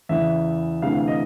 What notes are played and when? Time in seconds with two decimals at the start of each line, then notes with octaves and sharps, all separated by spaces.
0.09 E2 C#3 E3 E5
0.82 D2 C3 E3 F5
0.95 F5
1.08 D#5